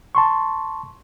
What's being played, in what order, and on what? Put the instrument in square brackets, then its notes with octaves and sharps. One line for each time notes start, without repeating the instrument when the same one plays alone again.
[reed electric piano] A5 C6 C#6